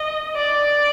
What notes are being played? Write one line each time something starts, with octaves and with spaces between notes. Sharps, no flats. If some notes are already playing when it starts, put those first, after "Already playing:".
Already playing: D#5
D5